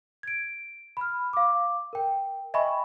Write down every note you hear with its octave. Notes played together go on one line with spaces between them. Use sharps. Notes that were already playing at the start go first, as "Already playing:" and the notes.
G#6 D7
B5 F6
F5 D6
A#4 G5
D#5 E5 G5 G#5 B5 C#6